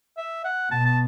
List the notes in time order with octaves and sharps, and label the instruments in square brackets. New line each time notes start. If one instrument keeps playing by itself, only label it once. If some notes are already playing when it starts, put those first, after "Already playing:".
[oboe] E5
F#5
[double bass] B2 [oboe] A5
[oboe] A5